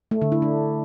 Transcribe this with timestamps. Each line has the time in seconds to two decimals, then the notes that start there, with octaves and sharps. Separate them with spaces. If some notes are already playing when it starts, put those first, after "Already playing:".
0.11 A3
0.22 D3
0.32 E4
0.42 D4